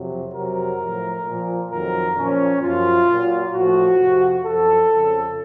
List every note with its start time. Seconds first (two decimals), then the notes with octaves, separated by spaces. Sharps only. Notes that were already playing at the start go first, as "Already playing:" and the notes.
Already playing: F2 C3 F#3
0.34 F2 C3 F#3 A#4
0.80 A2 F3
1.25 A#2 F3
1.71 F2 D#3 F#3 A#4
2.16 A#2 F3 C#4
2.62 F#2 F3 F4
3.08 A#2 F#3
3.52 A2 F3 F#4
3.98 F2 C3 F3
4.44 F#2 F3 A4
4.89 F2 C#3 F3